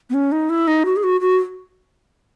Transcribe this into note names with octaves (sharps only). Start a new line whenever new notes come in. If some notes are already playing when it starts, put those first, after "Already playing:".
B3
C#4
D#4
E4
D#4
F#4
G#4
F#4
F#4